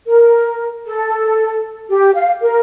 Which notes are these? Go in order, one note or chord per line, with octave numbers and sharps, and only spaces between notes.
A#4
A4
G4
F5
A#4